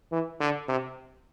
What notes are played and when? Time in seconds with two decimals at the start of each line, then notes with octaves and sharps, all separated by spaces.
0.12 E3
0.40 D3
0.68 C3